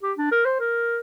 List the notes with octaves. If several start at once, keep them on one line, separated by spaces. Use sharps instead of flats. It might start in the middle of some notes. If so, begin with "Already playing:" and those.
G4
D4
A#4
C5
A#4